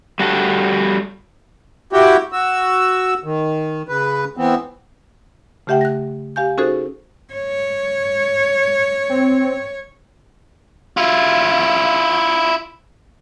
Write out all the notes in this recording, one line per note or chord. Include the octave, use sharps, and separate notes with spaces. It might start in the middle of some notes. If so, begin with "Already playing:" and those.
G3 F#4 A4
E4 F#4 G4 G5
F#4 E6
D#3
C#3 B4
E3 B3 C4
C#3 A3 G4 E5 F#5 G5
F#6 A#6
G4 F5 G#5 G6
C#4 D#4 F#4 G#4 A4 C5
C#5
C4
E4 F4